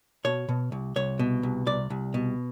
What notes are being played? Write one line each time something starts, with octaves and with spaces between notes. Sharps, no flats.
B2 C#5
B2
C2
C2 C#5
B2
C2
C2 D5
C2
B2